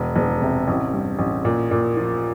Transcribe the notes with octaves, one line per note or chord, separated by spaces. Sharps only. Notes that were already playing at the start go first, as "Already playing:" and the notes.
Already playing: E1
E1
C3
A1
G2
A1
A#2
A#2
F3